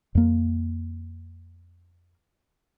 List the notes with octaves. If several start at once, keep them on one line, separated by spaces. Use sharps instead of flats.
F2 A#3